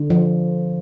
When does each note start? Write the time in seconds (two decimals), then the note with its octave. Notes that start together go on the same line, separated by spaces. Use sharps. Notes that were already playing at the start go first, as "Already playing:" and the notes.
Already playing: D3
0.10 F3